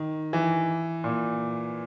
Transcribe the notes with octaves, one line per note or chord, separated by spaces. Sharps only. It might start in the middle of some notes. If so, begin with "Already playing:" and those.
Already playing: D#3
E3
A#2